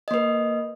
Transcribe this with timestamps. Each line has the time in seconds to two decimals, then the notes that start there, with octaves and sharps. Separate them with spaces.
0.08 D#5
0.11 A#3
0.14 B4